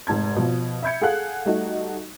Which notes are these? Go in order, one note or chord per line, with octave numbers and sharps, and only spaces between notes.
F1 G#2 A5 G#6
B2 F3
E5 B5 G6 G#6 C#7
G#4 A4 F5 F#5 F#6
G3 A3 D#4 F#4